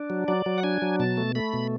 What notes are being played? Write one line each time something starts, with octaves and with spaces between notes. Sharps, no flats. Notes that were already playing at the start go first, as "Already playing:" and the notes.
Already playing: D4
F#3
F#3 D5
F#3
F#5
D4 G#5
F#3
B2 A5
A3
A3 B5
B2